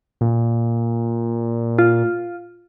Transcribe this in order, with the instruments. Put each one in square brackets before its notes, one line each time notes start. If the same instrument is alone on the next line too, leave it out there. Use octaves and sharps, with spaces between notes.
[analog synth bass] A#2
[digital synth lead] F4